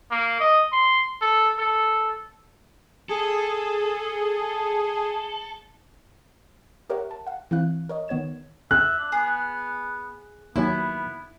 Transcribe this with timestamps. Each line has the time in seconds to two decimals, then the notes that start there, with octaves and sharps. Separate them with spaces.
0.11 A#3
0.40 D#5
0.72 C6
1.22 A4
1.59 A4
3.09 G#4 A4
6.90 G4 A#4 C#5 E5 F#5
7.11 A5
7.27 F5 F#5
7.51 E3 C4 E4 F5 F#6
7.89 A#4 C#5 D#5
8.08 D#3 B3 C#5 G#6 E7
8.71 E5 F#6
8.98 D4
9.12 B3 G#4
10.56 D#2 F#3 B3 E4 G#5